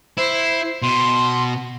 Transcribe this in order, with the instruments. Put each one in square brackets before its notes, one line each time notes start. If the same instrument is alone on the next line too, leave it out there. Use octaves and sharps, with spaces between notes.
[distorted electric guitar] E4 [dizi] C5
[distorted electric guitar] B2 [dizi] C6